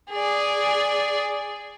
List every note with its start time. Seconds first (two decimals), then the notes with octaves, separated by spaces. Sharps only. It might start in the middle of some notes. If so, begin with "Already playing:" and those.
0.11 G#4 D5